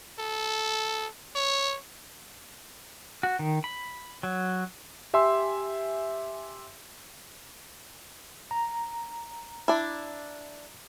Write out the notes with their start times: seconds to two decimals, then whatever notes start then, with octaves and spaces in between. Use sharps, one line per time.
0.19 A4
1.35 C#5
3.23 F#4
3.39 D#3
3.64 B5
4.23 F#3
5.14 G4 E5 G#5 C6 E6
8.51 A#5
9.68 D4 E4